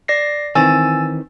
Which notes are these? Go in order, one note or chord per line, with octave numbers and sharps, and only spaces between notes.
D5 A#6 C7
D#3 E3 C4 G#5 E6 A6